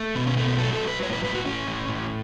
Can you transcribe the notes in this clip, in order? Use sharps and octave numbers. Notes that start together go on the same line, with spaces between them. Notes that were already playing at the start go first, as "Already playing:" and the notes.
Already playing: A3
B2 B3
C#4
A3 B3
B3
F#3 A4
A4
F#3
B4
A2 C#5
B4
A2 B4
F#4
A2 C#4
A2
A2